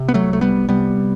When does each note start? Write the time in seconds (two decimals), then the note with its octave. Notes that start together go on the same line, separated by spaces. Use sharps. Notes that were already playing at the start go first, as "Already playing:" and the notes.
Already playing: C3
0.09 B3
0.14 F#3 A3
0.28 C2
0.33 A3
0.41 G3 B3
0.69 C3 G3 B3